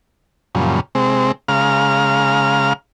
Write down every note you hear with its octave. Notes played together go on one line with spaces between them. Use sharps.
F#2 A#2 C#3 F3 G3
C3 G#3 C4
C#3 G#3 F5 A#5 F6